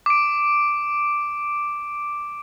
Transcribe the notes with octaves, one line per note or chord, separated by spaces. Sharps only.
D6 D7